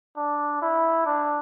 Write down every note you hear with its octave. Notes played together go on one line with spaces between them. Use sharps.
D4
E4
D4